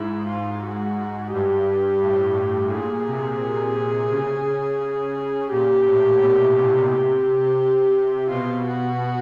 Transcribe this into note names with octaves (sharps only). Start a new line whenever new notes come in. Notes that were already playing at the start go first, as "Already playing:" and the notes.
Already playing: G#2 E4
F4
F#4
G2 G4
A2
A#2 G#4
C3
C#3
A#2 G4
A2
B2
C3
G4
B2 F4
F#4